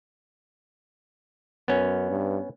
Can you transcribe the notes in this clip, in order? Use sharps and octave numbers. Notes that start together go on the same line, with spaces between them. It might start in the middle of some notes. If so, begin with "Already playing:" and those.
F#2 B3 C#4
G2